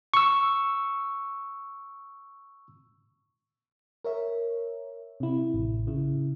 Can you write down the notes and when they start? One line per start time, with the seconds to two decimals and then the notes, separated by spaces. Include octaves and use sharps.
0.14 C#6 E6
4.04 A#4 C#5 E5
5.20 C3 E4
5.54 A1
5.87 C#3 E4